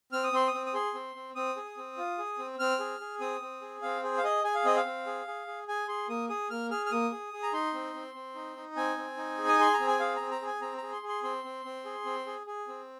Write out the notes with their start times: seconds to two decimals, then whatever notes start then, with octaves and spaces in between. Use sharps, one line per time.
0.12 C4 F6
0.24 D#6
0.32 C4 C6
0.47 D#6
0.54 C4
0.66 D#6
0.74 G#4 C6
0.94 C4
1.15 C4
1.35 C4 D#6
1.57 G#4
1.77 C4
1.97 F4
2.18 G#4
2.38 C4
2.59 C4 F6
2.80 G#4
3.00 G#4
3.20 C4 D#6
3.42 C4
3.62 G#4
3.82 C4 F5
4.03 G#4 C5
4.18 F5
4.24 G#4 D#5
4.44 G#4 G#5
4.55 F5
4.65 C4 D#5
4.76 F5
4.86 C4
5.06 G#4
5.27 G#4
5.47 G#4
5.68 G#4 G#5
5.88 G#4 C6
6.09 A#3 D#6
6.29 G#4 D#6
6.50 A#3 F6
6.71 G#4 F6
6.86 F6
6.91 A#3 D#6
7.12 G#4
7.33 G#4
7.43 A#5
7.53 D#4 C6
7.74 C4
7.94 C4
8.14 C4
8.35 D#4
8.57 D#4
8.76 C4 G#5
8.97 C4
9.17 D#4
9.38 G#4
9.49 D#6
9.59 G#4 C6
9.74 A#5
9.80 C4
9.88 G#5
10.00 G#4 F5
10.16 C4 A#5
10.31 A#5
10.42 G#4 G#5
10.61 C4 A#5
10.78 G#4 A#5
10.92 C6
11.03 G#4
11.08 C6
11.23 C4 C6
11.44 C4
11.65 C4
11.85 G#4
12.05 C4
12.27 G#4
12.47 G#4
12.68 C4